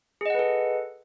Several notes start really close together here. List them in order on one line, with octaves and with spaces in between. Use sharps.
G#4 D#5 F#5 B4 A4